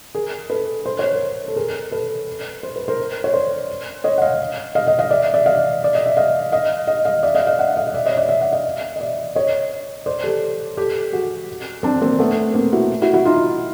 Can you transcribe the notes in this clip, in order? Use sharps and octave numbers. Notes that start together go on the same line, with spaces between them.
G#4 A#4
A4 B4
C5
C#5
A#4 C5
A4
G#4 A#4
A4 B4
C5
B4
A#4 C5
C#5
C5 D5
C#5 D#5
F#5
D#5 F5
D#5 F5
D#5 F5
D#5 F5
D5 E5
D5 E5
D#5 F5
D5
D#5
E5
D#5 F5
D#5 F5
D#5 F5
D#5 F5
D5 E5
D#5 F5
D#5 F5
E5 F#5
D#5 F5
D#5
D5 E5
C#5 D#5
D5 E5
D5 E5
E5 F#5
D#5 F5
D#5
D5 E5
C#5 D#5
C5 D5
G4 A4
G4 A4
F#4 G#4
C4 D4
A#3 C4
A3 B3
A#3 C4
E4 F#4
E4 F#4
E4 F#4
D#4 F4